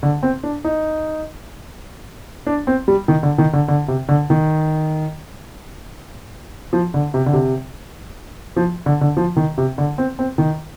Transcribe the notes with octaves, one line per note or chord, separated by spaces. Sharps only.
D3
C4
D4
D#4
D4
C4
G3
D#3
D3
D#3
D3
D3
C3
D3
D#3
F3
D3
C3
D3
C3
F3
D3
D3
F3
D#3
C3
D3
C4
C4
D#3